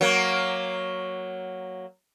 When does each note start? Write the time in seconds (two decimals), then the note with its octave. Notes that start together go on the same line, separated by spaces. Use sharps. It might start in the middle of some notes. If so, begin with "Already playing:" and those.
0.01 F#3 A#3